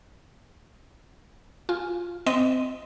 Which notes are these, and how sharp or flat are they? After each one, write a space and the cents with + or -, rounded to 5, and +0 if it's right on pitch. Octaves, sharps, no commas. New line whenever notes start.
F4 +0 G#5 +0
C4 -20 D#5 +0